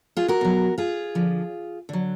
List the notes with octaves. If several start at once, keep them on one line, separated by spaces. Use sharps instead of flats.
F4 G#4
F#4 A#4
B2 F#3
F4 G#4
D3 F3
D3 F#3